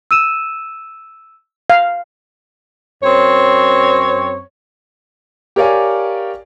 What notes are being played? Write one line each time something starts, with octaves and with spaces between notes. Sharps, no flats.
E6 D#7 E7
F5
F#2 C4 C#5
G4 A#4 C#5 D5 F5 G#5